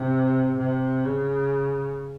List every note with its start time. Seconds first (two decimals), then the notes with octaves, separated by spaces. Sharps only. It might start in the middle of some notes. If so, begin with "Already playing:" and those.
Already playing: C3
0.58 C3
1.03 C#3